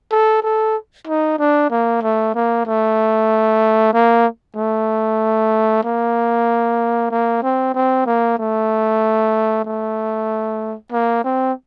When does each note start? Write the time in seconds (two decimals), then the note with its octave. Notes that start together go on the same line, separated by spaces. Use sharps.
0.12 A4
0.43 A4
1.07 D#4
1.39 D4
1.70 A#3
2.02 A3
2.35 A#3
2.66 A3
3.93 A#3
4.56 A3
5.84 A#3
7.10 A#3
7.43 C4
7.74 C4
8.06 A#3
8.38 A3
9.65 A3
10.93 A#3
11.24 C4